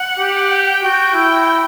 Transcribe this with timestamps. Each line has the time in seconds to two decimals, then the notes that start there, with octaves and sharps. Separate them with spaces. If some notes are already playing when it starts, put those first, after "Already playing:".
Already playing: F#5
0.19 G4
0.51 G5
0.83 F#4 G5
1.14 E4 G5